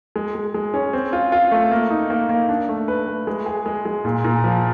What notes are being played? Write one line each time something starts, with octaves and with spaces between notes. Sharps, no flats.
G#3
G#3
G#3
C#4
C4
F4
F4
A3
A#3
D#4
A#3
A#3
D4
A3
B4
A3
G#3
G#4
G#3
G#3
A#2
A#2
F3